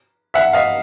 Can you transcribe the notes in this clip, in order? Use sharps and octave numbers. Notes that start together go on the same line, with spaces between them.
E5 F#5
D#5 F5